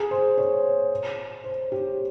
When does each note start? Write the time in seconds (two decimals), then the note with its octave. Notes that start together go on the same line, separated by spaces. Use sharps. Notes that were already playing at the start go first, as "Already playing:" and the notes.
Already playing: G#4
0.11 C5
0.38 C#5
1.44 C5
1.72 G4